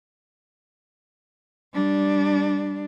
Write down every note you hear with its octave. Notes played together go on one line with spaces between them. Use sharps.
G3 D4